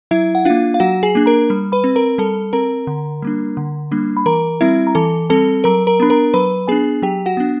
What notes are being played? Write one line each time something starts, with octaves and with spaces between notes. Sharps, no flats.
F#3 E4 E5
F#5
A#3 D4 F4 F5
F5
F#3 F#4 F#5
G#4 G#5
A#3 D4
A#4 A#5
G3
B4 B5
C4
A#4 A#5
G3 A4 A5
C4 A#4 A#5
D3
G3 A#3 D4
D3
G3 A#3 D4
B5
E3 A#4 A#5
G3 C4 E4 E5
A#5
E3 A4 A5
G3 C4 A4 A5
F#3 A#4 A#5
A#4 A#5
B3 D4 B5
A#4 A#5
F#3 B4 B5
B3 D4 G#4 G#5
F#3 G4 G5
F#4 F#5
B3 D4